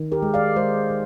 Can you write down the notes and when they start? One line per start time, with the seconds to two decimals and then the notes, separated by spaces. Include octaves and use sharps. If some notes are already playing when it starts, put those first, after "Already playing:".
Already playing: D#3
0.12 G4 A#4
0.22 G#3
0.34 D5 F5
0.56 G#3 C5 D#5
0.90 D#3